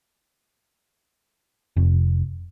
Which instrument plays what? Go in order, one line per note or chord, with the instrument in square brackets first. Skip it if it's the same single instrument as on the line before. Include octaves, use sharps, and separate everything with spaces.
[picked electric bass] F1